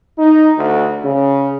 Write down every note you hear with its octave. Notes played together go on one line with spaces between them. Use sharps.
D#4
D2
C#3